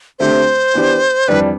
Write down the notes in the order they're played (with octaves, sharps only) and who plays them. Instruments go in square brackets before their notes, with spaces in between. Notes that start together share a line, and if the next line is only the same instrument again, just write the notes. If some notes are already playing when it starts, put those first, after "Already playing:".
[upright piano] D3 A3 C4 G4 [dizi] C5
[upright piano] E3 B3 D4 G4
[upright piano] F2 E3 G3 D4 [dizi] B4